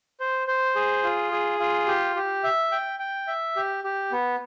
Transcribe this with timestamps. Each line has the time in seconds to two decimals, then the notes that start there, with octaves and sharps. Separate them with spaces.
0.20 C5
0.48 C5
0.76 G#4
1.04 F4
1.32 G#4
1.60 F4
1.87 G4
2.16 G4
2.44 E5
2.72 G5
2.99 G5
3.27 E5
3.56 G4
3.84 G4
4.12 B3